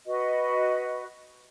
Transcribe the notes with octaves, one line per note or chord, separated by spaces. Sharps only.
F#4 B4 D#5